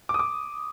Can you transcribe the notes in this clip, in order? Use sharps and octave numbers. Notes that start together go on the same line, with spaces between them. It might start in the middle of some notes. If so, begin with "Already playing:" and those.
D6
D#6
D6